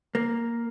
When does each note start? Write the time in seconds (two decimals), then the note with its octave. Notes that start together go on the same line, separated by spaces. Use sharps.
0.15 A#3